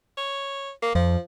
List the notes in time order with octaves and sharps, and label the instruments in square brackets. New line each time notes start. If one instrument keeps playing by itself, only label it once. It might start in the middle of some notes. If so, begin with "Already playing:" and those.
[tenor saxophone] C#5
A#3
[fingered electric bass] F2 [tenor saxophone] F3